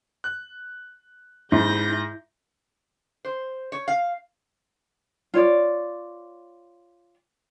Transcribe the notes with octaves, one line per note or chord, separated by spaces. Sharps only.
F#6
G#2 E4 G6 A#6
C5
C#5
F5
F4 C#5 D5